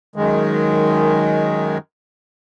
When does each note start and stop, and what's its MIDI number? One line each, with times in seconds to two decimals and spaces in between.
0.16 1.78 42
0.16 1.78 51
0.16 1.78 56